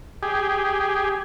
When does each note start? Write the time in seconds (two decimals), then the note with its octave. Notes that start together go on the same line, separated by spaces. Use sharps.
0.23 G4 G#4